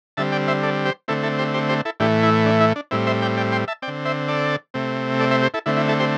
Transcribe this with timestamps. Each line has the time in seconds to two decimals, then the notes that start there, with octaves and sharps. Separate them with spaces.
0.17 D3 G3 C4 E5 A5
0.32 D5 G5
0.48 C5 E5
0.63 A4 D5
0.85 G4 C5
1.08 D3 A3 C4 E4 A4
1.23 E4 A4
1.39 G4 C5
1.54 G4 C5
1.69 G4 C5
1.85 E4 A4
2.00 A2 E3 A3 D4 G4
2.23 E4
2.46 D4
2.61 E4
2.76 D4
2.91 A2 G3 C4 E4
3.07 C5 E5
3.22 D5 G5
3.37 D5 G5
3.52 G5 C6
3.68 E5 A5
3.82 C4 D5 G5
3.88 D3
4.05 C5 E5
4.28 A4 D5
4.74 C3 A3 C4
5.20 A4 D5
5.31 C5 E5
5.42 G4 C5
5.54 E4 A4
5.66 D3 A3 C4 E4
5.77 E4
5.88 E4 A4
6.00 G4 C5